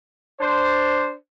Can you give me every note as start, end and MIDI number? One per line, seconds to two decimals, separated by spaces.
0.41 1.13 62
0.41 1.13 72